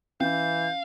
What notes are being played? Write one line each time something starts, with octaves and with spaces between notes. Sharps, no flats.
E3 C#4 F5 G6